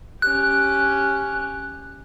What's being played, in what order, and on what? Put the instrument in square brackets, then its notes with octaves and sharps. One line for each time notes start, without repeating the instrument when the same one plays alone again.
[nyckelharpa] C#4 G4 [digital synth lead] F#6